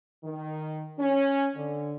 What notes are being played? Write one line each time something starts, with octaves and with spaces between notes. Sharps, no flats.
D#3
C#4
D3